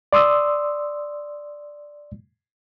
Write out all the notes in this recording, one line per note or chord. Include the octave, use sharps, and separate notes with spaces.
D5 C6 D#6 E6